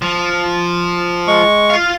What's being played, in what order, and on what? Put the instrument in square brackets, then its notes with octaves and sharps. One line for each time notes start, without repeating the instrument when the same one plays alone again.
[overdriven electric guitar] F3
[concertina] G#3 C#6
[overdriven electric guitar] F4 F5